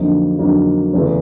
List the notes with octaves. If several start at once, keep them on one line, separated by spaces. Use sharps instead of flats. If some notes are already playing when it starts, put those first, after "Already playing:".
Already playing: F2 D3 F#3 A#3 D#4
F2 D3 F#3 A#3 D#4
E2 C#3 E3 A3